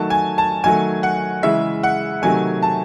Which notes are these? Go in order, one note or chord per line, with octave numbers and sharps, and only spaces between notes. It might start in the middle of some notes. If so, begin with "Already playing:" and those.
Already playing: D#3 F#3 A3 A5
G#5
A5
D#3 F#3 A3 G#5
F#5
C#3 E3 G#3 E5
F#5
C3 D#3 F#3 A3 G#5
A5